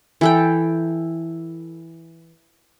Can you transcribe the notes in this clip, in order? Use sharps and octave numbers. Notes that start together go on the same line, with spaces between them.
E3 A4 G5